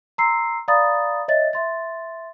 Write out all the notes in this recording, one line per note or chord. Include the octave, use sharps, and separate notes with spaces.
A#5 C6 E6 C7
D5 F5 A#5 B5 D#6 A6
C#5 D#5 E5 A6
E5 C6 A6